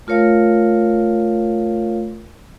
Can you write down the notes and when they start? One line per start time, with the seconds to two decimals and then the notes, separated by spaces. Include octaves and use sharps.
0.07 A3 F4 A#4 C#5 F5